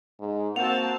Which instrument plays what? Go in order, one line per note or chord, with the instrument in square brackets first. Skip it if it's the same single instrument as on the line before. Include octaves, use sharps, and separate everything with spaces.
[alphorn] G#2
[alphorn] A#3 [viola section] C4 F#4 A5 [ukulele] F#5 [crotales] F7